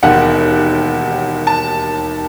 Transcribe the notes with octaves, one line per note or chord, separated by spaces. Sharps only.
E1 D#2 D#3 F#5
A5